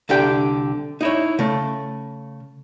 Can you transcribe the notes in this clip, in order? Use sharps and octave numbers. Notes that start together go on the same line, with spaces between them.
C2 D3 G4 G5
D#4 E4 C#5
C#3 A3